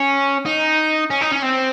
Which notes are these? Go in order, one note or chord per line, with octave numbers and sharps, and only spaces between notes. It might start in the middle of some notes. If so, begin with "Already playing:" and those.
Already playing: C#4
D#4
C#4
D#4
C#4
C4